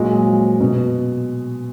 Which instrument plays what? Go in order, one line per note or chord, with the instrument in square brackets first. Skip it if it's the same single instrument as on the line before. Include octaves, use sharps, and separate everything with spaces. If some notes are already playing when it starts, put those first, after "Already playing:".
Already playing: [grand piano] A#2 F#3 G#3
F3
B2